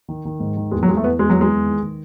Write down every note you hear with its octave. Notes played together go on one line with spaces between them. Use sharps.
D#3
D#3
G#2
D#3
E2 G#3
F#3
E2 G#3
A3
E2 B3
E2 G#3
E2 F#3
G#3
E2
D#3
D#3